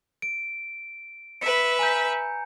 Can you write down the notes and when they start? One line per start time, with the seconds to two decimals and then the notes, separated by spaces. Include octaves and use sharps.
0.22 D7
1.41 B4 E5 C#7
1.79 G#5 A#5 G6